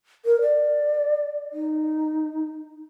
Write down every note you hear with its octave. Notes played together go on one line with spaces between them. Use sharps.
A#4
D5
D#4